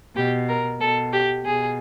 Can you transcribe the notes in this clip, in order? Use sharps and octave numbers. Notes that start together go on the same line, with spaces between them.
B2 G4
A#4
B2 A4
G4
B2 G#4